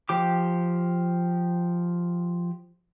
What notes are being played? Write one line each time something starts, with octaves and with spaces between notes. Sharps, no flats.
F3 G4 D6